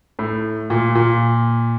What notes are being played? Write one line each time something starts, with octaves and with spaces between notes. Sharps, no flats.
A2
A#2
A#2